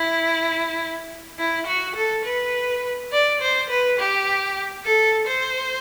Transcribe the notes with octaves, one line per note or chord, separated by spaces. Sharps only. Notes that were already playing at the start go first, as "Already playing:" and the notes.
Already playing: E4
E4
F#4
A4
B4
D5
C5
B4
G4
A4
C5